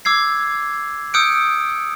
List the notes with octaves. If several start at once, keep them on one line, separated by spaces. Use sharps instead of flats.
D6 E6 G#6 C7
D#6 E6 F#6 G6 C#7 D7